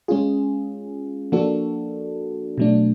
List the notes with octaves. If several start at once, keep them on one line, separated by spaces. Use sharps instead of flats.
G#3 C#4 F4 G#4
F3 A#3 D4 F#4 A4
B2 F#3 A3 D4